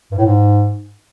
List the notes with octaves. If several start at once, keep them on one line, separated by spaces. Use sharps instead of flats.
G2
A2
G#2